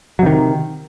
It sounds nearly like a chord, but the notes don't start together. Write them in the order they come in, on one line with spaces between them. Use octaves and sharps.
F#3 C3 D#3